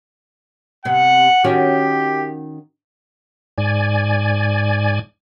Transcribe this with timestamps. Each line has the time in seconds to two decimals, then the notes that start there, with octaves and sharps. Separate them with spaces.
0.85 C3 B3 F#5
1.44 D#3 C#4 F#4 G4
3.58 G#2 D5 G#5